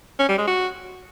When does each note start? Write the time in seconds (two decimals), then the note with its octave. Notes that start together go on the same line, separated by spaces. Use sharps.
0.19 C#4
0.29 G3
0.38 G#3
0.47 F#4